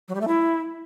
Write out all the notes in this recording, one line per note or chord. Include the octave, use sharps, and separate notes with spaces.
F#3
G3
A3
E4